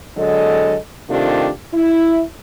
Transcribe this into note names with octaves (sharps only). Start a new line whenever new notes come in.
D3 F#3 G#3 A4 D#5
C3 D#3 A3 D4 F4 G4
E4